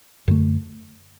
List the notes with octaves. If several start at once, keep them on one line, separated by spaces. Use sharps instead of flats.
F#2 D3 A3